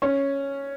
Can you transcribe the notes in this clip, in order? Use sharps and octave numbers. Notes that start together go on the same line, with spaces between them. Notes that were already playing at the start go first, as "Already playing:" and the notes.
C#4